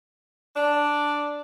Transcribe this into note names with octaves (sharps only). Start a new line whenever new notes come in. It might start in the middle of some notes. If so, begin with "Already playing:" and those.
D4 D5